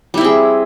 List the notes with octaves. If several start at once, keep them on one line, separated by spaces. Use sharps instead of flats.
G3 C4 E4 G#4